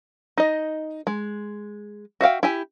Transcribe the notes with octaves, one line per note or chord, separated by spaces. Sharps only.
D#4 D#5
G#3
F#4 E5 F5 G5
E4 G4 G#5